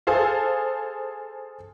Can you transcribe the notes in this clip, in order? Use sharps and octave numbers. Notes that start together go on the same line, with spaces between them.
G#4 A4 C5 F5